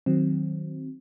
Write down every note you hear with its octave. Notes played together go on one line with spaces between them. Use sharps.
D#3 F#3 C4